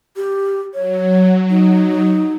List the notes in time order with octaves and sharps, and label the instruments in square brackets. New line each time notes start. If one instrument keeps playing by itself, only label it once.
[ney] G4
[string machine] F#3 [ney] C#5
[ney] D#4